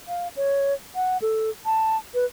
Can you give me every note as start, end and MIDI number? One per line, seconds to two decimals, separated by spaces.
0.08 0.28 77
0.36 0.74 73
0.95 1.18 78
1.22 1.50 69
1.66 1.97 81
2.14 2.25 71